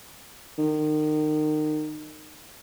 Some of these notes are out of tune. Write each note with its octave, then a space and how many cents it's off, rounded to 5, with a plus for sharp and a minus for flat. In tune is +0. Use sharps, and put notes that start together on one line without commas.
D#3 -30